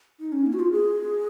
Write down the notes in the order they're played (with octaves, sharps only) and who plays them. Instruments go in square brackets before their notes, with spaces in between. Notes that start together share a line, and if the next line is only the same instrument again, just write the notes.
[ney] D#4
C#4
A#3
F#4
F4
G#4